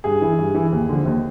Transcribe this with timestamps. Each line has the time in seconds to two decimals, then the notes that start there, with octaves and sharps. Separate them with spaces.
0.04 G2 G#4
0.22 E3
0.38 G2
0.54 E3
0.72 D#2
0.89 D3 F3
1.05 D#2